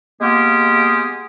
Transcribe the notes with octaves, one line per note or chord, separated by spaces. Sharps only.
G#3 A#3 B3 F4 G4 G#4